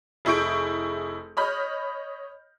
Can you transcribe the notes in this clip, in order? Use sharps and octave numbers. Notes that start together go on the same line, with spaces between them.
F1 E4 G#4 C#6 G6 D7
C#5 D#5 B5 F6 G6